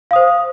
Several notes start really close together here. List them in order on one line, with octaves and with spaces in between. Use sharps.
F5 D#6 C5